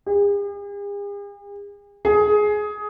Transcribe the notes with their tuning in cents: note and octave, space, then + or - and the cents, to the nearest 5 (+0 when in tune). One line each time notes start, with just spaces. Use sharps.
G#4 -45
G#4 +15